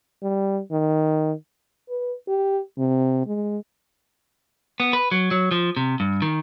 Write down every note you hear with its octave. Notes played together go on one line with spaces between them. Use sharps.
G3
D#3
B4
G4
C3
G#3
B3
B4
F#3
F#3
F3
C3
G2
D#3